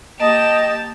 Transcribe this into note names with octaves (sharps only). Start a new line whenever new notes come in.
A#3 G4 D#5 A5